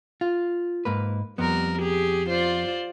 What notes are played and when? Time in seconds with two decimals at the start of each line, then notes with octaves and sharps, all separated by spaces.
0.21 F4
0.85 G#2 A#3 B4
1.38 F2 G3 B3 A#4
1.79 G4 G#4
2.29 F4 C5 D5